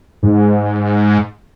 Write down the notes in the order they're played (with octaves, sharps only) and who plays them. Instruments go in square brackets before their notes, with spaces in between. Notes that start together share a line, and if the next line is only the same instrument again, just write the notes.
[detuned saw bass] G#2